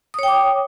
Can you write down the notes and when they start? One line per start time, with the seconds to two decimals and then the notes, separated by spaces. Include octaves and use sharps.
0.14 D#6
0.19 C#5
0.23 G5
0.28 D6